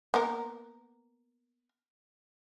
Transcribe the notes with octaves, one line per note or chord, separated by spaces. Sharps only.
A#3 B3 A#4